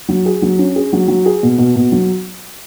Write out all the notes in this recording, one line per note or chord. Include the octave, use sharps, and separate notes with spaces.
F#3
G#4
F#3
C#4
G#4
F#3
F#3
G#4
B2
B2
B2
F#3